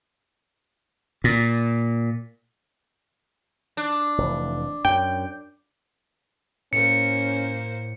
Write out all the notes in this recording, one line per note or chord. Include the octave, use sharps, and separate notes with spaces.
A#2
D4
F1 E3
F#2 G5
A2 A#3 C#4 C5 C#7